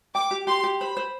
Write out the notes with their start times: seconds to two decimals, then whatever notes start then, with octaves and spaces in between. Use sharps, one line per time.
0.15 G5 D6
0.31 G4
0.47 G4 C6
0.64 G4
0.80 C5 B5
0.97 C5